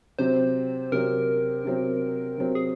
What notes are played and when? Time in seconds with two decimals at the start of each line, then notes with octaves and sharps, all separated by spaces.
0.19 C3 F#3 C4 C5
0.92 C3 F#3 C4 A#4
1.65 C3 F#3 C4
2.38 C3 F#3 C4
2.55 G#4